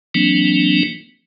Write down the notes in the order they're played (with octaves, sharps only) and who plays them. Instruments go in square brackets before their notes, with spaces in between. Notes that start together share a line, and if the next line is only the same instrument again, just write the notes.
[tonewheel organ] E3 F#3 A#3 C4 D4